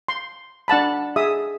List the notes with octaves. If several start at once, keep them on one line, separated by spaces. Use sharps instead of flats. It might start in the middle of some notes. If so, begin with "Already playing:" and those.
C6
D4 F#5 A5 B5
G#4 E5 D#6